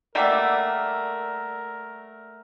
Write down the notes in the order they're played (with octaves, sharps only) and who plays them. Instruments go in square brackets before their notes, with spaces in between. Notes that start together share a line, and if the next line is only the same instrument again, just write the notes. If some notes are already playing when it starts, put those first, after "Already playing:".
[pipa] G3 A3 A#3 [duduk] A#4 [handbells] D5 F#5 E6